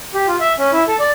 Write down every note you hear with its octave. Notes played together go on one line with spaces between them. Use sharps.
G4
F4
E5
C#4
E4
A4
D5